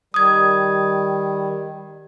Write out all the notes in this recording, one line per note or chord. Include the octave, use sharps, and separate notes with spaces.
D#3 G3 D#6 G#6